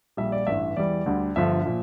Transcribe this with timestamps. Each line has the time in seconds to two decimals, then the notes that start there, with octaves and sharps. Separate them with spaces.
0.17 A#1 A#2 G3 E5
0.32 D5
0.47 A1 G2 E3 E5
0.77 E2 E3 G3 D5
1.06 D2 D3 G3
1.36 G1 G2 D3 F3 E5
1.65 A#2 F3